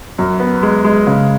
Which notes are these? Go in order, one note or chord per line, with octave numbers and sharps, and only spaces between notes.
F#2
B3
G#3
G#3
C#3